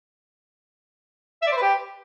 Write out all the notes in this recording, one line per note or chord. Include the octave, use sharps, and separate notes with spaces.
E5
D5
C5
B4
G4